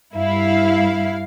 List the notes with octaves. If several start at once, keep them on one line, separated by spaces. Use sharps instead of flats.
G2 E4 F5